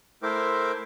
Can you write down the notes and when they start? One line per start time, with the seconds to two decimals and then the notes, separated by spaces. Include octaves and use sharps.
0.23 A3 E4 A#4 C5 G5 D6